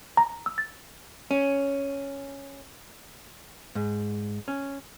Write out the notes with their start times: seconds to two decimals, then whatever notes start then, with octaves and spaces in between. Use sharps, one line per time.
0.17 A#5
0.46 E6
0.58 A6
1.31 C#4
3.75 G#2
4.48 C#4